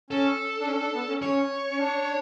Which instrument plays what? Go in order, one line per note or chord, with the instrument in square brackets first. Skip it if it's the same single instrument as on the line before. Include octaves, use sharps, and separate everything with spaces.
[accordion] C#4 [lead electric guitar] A4
[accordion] D4
C#4
D4
B3
C#4
[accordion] C#4 [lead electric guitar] C#5
[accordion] C#4
D4